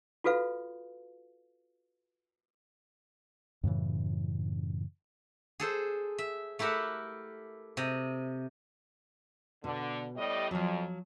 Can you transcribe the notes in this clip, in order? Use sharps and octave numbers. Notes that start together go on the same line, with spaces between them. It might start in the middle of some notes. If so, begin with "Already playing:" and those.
F4 F#4 A4 B4 F5
F#2 A2 C#3 E3
G#4 A4 C5
E5
A3 E4 G4 A#4 E5 F#5
C3 D#5
B2 D3
A2 G3 D#5
F2 F3 F#3